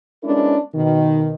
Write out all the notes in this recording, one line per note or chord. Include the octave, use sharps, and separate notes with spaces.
G#3 B3 C#4 D4 E4 A#4
B2 D#3